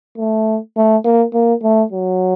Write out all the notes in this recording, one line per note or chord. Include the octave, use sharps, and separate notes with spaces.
A3
A3
A#3
A#3
A3
F#3